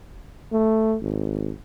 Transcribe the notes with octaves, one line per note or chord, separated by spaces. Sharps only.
A3
G#1